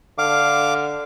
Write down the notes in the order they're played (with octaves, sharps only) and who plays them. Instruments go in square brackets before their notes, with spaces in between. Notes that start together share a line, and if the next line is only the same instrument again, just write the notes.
[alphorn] D3 [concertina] F5 D6